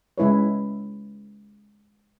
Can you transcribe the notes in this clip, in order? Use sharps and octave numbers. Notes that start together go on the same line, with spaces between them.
C#3 G#3 E4 B4 C#5